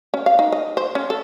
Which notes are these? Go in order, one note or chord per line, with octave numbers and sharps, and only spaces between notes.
C#4
F5
D#4
D#5
C5
C#4
A4